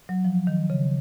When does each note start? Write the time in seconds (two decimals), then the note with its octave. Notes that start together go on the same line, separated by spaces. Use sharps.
0.09 F#3
0.25 F3
0.47 D#3
0.70 C#3